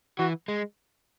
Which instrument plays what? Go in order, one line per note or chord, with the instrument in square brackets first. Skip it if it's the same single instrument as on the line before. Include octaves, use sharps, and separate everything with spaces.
[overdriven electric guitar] E3 [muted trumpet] F#4
[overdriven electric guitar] G#3